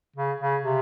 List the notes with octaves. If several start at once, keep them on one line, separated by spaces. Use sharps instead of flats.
C#3
C#3
C3